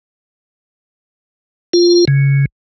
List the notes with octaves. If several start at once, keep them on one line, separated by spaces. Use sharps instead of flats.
F4
C#3